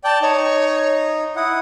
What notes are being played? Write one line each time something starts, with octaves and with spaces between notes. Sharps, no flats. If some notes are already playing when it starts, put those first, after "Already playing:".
D5 G5 A5
D#4 C#5
E4 F#5 D#6